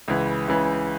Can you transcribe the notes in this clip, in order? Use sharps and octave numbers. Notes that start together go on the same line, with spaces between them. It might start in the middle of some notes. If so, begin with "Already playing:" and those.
C#2 C#3 E3
C#2 C#3 E3